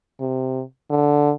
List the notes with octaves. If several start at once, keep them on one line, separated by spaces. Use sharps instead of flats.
C3
D3